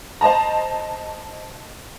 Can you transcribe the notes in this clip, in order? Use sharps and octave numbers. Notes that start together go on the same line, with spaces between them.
C5 D#5 A5 A#5